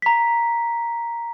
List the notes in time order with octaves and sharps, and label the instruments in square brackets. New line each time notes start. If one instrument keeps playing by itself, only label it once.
[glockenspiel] A#5 B6